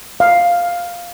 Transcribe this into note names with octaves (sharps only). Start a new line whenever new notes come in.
F5